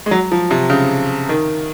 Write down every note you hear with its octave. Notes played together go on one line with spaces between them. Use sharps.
G#3
F#3
F3
C3
C#3
D#3